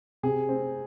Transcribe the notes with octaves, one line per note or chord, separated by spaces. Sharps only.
C3 G#4
C4